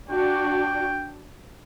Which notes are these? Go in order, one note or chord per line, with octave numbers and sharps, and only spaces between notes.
D4 F#4 G5